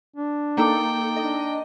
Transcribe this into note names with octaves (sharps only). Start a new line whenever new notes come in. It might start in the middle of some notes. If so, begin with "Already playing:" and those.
D4
A#3 D#4 A4 G5 A#5 D6
D4 D#5